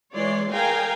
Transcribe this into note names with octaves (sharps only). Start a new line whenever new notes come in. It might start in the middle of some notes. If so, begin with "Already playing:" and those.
E3 G#3 C#5 D5 C6
G#4 A#4 F5 G5 G#5 A#5